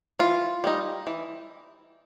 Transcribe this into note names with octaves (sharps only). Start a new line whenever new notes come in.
E3 F4
G3 B3 D#4
E3